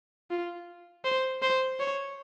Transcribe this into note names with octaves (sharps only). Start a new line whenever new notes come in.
F4
C5
C5
C#5